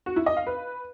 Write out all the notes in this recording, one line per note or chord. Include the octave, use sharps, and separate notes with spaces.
F#4
E4
D#5
F5
B4